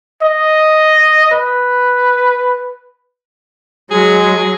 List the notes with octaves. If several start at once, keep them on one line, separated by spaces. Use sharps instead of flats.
D#5
B4
F#3 G#3 G#4